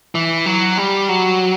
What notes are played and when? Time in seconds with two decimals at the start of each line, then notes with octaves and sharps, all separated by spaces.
0.15 E3
0.46 F#3
0.78 G3
1.09 F#3